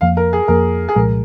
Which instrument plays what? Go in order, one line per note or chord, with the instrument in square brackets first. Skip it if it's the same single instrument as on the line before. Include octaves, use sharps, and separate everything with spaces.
[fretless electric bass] F2 F3 A#3 [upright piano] F5
[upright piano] A#4
G#4
[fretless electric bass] F2 F3 A#3 [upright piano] A#4
[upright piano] G#4
[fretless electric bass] C2 A#2 F3 G#3 [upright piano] A#4